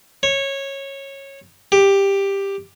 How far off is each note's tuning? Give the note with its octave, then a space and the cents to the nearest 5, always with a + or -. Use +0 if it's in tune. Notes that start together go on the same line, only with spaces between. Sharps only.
C#5 -15
G4 +10